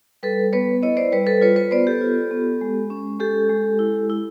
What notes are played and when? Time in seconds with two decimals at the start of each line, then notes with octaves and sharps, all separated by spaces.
0.23 G3 A4 B4
0.53 B3 B4 C#5
0.83 E4 C#5 D#5
0.97 C5 D5
1.12 G3 B4 C#5
1.27 A4 B4
1.41 F4 B4 C#5
1.56 B4 C#5
1.71 B3 C5 D5
1.87 G4 A4
2.01 F4
2.31 B3
2.61 G#3
2.90 C#4
3.20 G#3 G4 A4
3.49 G#3
3.79 E4
4.10 E4